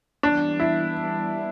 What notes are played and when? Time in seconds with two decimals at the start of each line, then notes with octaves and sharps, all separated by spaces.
0.23 E3 G3 B3 D4
0.60 E4